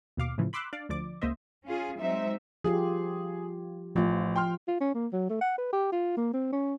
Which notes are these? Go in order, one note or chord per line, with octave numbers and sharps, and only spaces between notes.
D#2 B2 F5 D6
A2 C#3 E3 F3
B5 C6 D6 E6 F#6
D4 D5 F5
D2 F3 D5 D6
C#2 A#3 C5 D#5 E5
C#4 F4 G#4
F#3 G#3 C4 D#4 E5
F3 F4 G4 G#4
A1 F3 F4
G5 C6 F6
F4
C#4
A#3
F#3
A3
F#5
B4
G4
F4
A#3
C4
C#4